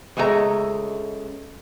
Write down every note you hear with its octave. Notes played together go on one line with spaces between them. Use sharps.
C#2 G#3 A3 D#5 A#5